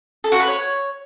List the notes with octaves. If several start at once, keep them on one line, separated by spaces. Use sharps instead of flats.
A4
F#4
B4
C#5